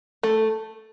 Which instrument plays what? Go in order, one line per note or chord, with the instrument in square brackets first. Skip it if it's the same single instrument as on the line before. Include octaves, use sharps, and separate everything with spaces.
[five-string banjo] A3